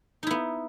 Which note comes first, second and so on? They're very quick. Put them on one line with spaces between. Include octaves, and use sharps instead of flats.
D#4 E4 B3